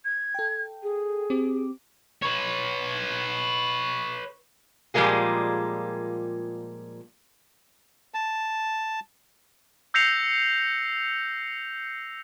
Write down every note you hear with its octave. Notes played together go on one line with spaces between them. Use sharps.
G#6
A4 G5
G#4
C4 G4 D6
B4 C#5
A#2 F3 G3 G#3 A#3 G#4
A5
E6 G6 A#6 C7 C#7 F7